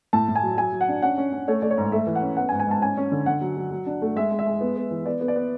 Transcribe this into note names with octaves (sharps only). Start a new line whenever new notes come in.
A2 A5
A2
G#5
F#3
F#3 G#5
F#3
F#5
D4
C#4 F#5
C#4
C#4
A3 C#5
A3 D5
C#5
G#2
A3 E5
E3
F#5
C#4
B3 F#5
G#5
G#2
G#5
G#2 A5
C#4 G#5
C#4
D3
D3 F#5
F#3
F#3
F#3
D4
A3
G#3 E5
G#3
E5
G#3
B3
B3
E3
B3 D5
B3
D5
B3